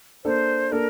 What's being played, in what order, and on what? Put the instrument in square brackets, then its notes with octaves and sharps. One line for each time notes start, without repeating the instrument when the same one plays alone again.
[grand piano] A#3 D4 A4 [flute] C5
[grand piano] A#3 D4 A4 [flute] A#4